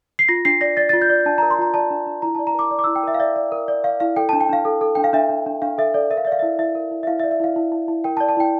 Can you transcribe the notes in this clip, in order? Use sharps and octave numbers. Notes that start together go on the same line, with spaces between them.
C7
F4 A#6
D4 C7
D5 A#6
D5 A6
F4 A6
G6
D5
D4 A5
A#4 A#5
C6
F4 A#5
D5 A5
D4
D4
E4 A#5
D5 A5
A#5
A#4 D6
D5
D6
E4 E6
G5
A#4 E5
F5
D5 E5
D5
A#4
D5
D5 F5
E4 F5
A4 G5
D4 A5
G5
D4 F5
A4
A4
D4 G5
F5
D4 E5
D4
D4
D4 F5
A4 E5
A4 D5
A#4 E5
F5
D5 E5
F5
E4 E5
E4 E5
A#4
E4
E5
E4 F5
E5
D5
E5
E4 F5
E4
E4
E4
A#4 G5
A5
D5
A5
E4 G5